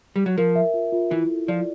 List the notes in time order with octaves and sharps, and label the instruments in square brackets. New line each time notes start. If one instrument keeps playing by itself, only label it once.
[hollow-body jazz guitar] G3
F#3
[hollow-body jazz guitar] F3 [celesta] A#4
[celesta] E5
F4
F4
[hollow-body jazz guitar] E3 [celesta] E4
[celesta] A4
[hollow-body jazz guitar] F3 [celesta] D5